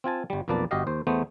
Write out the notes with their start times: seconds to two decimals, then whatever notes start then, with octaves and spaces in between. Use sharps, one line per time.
0.04 C4 F4 G#5 A5
0.30 G1 G3
0.48 B1 F2 A#3 B4 D5 A5
0.71 G1 F#4 G4 D#5 F5
0.87 D#2 C5
1.07 E2 A3 B3 C5